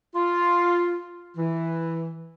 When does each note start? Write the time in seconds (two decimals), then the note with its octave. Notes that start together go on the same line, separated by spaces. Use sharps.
0.15 F4
1.37 E3